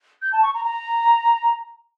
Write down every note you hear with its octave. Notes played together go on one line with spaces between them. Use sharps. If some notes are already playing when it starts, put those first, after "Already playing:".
G6
A5
C#6
A#5
A#5